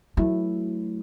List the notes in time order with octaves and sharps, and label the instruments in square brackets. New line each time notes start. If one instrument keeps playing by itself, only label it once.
[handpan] F#3 E4 [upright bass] A3